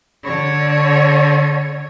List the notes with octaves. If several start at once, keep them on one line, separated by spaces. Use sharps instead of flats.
D3 C#5